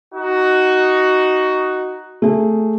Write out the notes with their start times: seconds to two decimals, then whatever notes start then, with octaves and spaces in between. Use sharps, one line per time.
0.14 D#4 F#4
2.22 A3 G#4